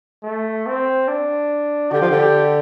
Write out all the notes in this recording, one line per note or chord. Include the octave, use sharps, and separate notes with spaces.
A3
C4
D4
D3 G4
F3
D3
G4